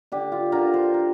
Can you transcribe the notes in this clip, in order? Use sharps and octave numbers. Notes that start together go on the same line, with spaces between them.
D3 G4
F4
D3 A#4
C5
A#4